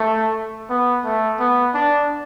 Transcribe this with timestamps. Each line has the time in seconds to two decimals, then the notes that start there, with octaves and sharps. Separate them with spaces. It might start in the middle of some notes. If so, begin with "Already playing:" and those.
Already playing: A3
0.70 B3
1.04 A3
1.40 B3
1.74 D4